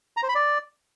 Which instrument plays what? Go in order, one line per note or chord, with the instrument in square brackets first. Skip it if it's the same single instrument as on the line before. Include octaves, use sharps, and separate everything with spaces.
[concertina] A#5
C5
B5
D5